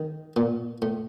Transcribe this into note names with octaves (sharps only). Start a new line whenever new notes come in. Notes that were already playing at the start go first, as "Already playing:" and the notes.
Already playing: D#3
A#2
A2